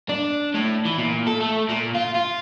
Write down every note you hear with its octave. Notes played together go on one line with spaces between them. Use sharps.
D4
A2
E3
A#2
A4
A3
A#2
F4
F4